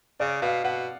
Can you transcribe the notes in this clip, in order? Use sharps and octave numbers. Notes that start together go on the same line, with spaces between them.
C#3 D5
B2 F5
B2 F#5